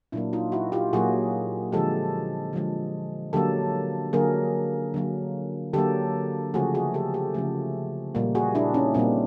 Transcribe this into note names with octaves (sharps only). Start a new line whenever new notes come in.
A#2 F#3 A#3 D4 E4
D#4 F4
E4 F#4
F4 G4
A#2 F#3 A#3 F#4 G#4
D3 F3 G#3 G4 A4
D3 F3 G#3
D3 F#3 A#3 G4 A4
D3 F#3 A#3 G#4 A#4
D3 F#3 A#3
D3 F#3 A#3 G4 A4
C#3 F3 A3 F#4 G#4
F#4 G#4
G4 A4
G4 A4
C#3 F3 A3
A#2 G3 A#3
F#4 G#4
D4 E4
C#4 D#4
A#2 G3 A#3 C4 D4